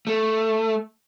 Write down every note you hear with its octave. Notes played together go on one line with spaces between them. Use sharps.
A3